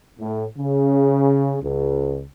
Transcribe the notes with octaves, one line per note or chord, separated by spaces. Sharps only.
A2
C#3
C#2